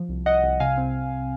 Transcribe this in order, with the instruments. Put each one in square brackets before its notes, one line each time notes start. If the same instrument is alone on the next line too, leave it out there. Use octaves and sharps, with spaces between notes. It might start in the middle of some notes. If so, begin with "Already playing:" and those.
Already playing: [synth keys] F3
C2
C2 D#5 F#5
C2
C3 F5 G#5
C4